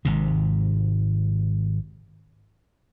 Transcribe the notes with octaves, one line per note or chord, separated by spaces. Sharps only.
G#1 G#2 C3